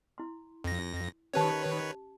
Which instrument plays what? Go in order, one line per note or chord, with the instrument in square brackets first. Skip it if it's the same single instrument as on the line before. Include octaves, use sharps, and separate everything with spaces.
[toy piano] E4 C6
[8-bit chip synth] F2 A#6
[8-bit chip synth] D#3 B4 C#5 [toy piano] C#4 G4 A5